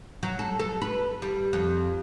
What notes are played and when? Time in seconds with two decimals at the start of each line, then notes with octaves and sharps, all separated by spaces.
0.23 F#3
0.39 A4
0.59 A4
0.82 B4
1.22 G3
1.53 F2